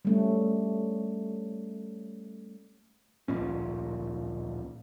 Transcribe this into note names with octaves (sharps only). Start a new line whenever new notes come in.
G3 A3 C#4
D1 A#1 A#2 C#4